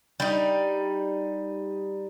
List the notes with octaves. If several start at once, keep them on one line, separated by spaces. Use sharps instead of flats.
G3 D#4